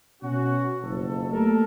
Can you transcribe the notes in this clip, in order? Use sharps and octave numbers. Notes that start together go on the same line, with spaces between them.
B2 C#4 F#4
F#1 F2 A4
A3 A#3 G4 A4 A#4